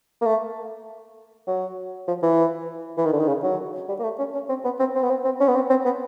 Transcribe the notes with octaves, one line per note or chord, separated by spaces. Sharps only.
A#3
A3
F#3
F3
E3
E3
D#3
D3
D#3
C#3
F#3
G3
A#3
A3
C#4
C#4
C4
B3
C4
C4
B3
C4
C4
C#4
B3
C4
C4
B3